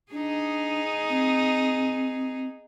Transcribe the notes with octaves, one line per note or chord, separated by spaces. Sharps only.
D4 D#4 G#4
C4